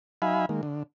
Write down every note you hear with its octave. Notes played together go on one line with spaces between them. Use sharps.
F#3 D#4 E5 F5 G#5 B5
D#3 G#3 A#3
D3